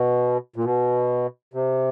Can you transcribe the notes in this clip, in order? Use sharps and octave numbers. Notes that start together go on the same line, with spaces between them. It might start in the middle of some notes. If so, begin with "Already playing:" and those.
Already playing: B2
A#2
B2
C3